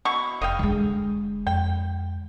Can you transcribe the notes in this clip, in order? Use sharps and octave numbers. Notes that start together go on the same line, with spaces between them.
B2 E4 C#6
F1 D#5 F5 G5
D3 G#3
F2 G5